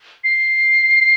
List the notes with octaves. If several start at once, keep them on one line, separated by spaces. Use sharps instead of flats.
C7